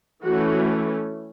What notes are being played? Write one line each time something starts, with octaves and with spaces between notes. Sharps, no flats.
E3 A3 C#4 F#4